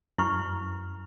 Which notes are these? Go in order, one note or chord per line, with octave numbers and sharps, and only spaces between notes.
F#2 E4 C#6 F6